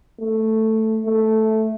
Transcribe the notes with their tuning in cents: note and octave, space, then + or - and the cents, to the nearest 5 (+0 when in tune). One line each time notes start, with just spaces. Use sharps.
A3 +5
A3 -5